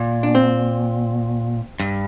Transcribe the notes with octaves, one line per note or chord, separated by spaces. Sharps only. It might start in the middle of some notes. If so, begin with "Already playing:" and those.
Already playing: A#2
D4
C4
G2